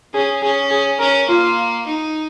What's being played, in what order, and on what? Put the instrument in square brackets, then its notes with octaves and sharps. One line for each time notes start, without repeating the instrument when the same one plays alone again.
[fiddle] C#4 [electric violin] G#4
[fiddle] C#4 [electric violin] G#4
[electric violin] G#4
[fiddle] C#4 [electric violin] A#4
[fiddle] A#3 [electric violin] F4
[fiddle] D#4